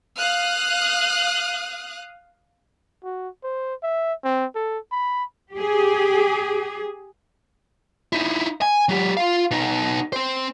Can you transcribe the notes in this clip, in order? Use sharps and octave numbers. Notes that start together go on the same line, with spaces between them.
F5 D#6 F6 F#6
F#4
C5
E5
C4
A4
B5
G4 G#4
D#4 E4
G#5
F#3 G4
F4 F5
B2 D#4
C4 C5